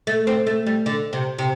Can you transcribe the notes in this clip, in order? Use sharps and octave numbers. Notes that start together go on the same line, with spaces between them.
A3
C4
A3
G3
D3
C3
C3